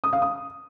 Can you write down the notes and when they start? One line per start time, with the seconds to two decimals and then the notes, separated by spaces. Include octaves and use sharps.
0.04 D#6
0.13 F5
0.22 D#6